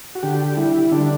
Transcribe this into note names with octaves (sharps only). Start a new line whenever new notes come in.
F#4
D3 G4
G3 E4
D3 D4